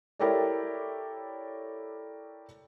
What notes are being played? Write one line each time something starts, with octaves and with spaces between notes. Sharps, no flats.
E4 G4 A4 A#4 C#5 D5